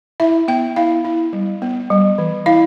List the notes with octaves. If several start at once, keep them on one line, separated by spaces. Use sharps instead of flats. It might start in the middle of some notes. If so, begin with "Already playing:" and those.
E4 E5
B3 G5
E4 F5
E4
G3
B3
G3
E3
E4 F5